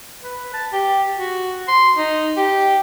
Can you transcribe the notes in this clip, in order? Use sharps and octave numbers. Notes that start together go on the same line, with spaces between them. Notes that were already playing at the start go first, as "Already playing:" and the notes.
B4
A5
G4
F#4
C6
D#4
G4